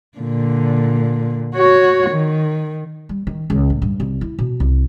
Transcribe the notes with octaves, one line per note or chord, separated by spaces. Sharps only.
A#2 D3
F#4 C#5
D#3
G3
D#3
C#2
A2
G2
C2
E4
B2
C2